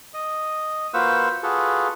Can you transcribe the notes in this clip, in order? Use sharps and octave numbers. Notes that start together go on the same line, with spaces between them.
D#5
A#3 F4 F#4 B4 C5 E6
F4 F#4 G#4 A4 B4